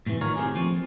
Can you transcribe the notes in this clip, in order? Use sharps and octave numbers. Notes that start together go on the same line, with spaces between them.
A2 C3 D#3 E3
D#3 D#4 F4 A#4 C#5
A3 C4 G4 G#4
F3 C4